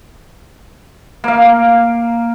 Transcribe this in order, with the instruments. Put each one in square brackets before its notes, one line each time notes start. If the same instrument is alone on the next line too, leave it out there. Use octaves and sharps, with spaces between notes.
[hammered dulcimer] A#3 F5